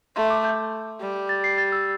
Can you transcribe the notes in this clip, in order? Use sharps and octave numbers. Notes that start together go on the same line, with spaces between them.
A3 C6
D6
G6
G3
A6
C7
A6
E6